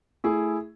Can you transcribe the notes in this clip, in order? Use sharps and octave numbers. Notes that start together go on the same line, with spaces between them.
A3 E4 G#4